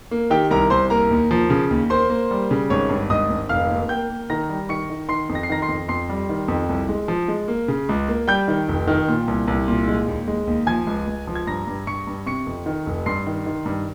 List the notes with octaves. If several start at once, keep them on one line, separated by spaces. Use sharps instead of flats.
A#3
D#3 G4 G5
C2 A#4 A#5
C2 C5 C6
A#3 A#4 A#5
D#2
F3
C#3
D#2
A#3 C5 C6
A#3
G3
C#3
G#1 C#5 C#6
G2
G#1 D#5 D#6
G#1
F1 F5 F6
A#3
A#3 G5 G6
A#3
D#3 A#5 A#6
G3
D#3 C#6 C#7
D#3
D#3 C6 C7
F2
A#6
C7
D#3 A#5 A#6
C6 C7
F2
F2 C6 C7
G3
D#3
F2
C2
G#3
F3
G#3
A#3
C#3
C#2
A#3
G3 G5 G6
D#3
F1
D#3
A#2
C2
C2
A#2
G#3
D#2
G#3
D#2
F3 G#5 G#6
C#2
C#2
F3
G#6
G2 A#5 A#6
G2
G2 C#6 C#7
G2
C3 C#6 C#7
F2
D#3
F1
G2 C6 C7
D#3
D#3
G2